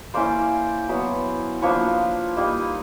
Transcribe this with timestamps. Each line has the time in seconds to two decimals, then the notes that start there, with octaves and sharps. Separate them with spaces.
0.14 A#3 C#4 E4 C5 D5
0.88 F#3 B3 E4
1.62 F3 A#3 D4 F4 B4 C#5
2.37 G3 A#3 D#4